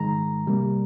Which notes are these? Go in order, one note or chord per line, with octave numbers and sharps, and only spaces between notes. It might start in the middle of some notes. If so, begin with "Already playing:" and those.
Already playing: G#2 D#3 G#3 A#5
C3 G3 A#3